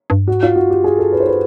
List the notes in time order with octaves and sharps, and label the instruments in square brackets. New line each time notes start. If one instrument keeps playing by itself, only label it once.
[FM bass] G2
[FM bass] G#2 [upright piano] F#4
[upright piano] F4
[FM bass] G2 [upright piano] F#4
[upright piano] G4
G#4
A4
B4
C5
B4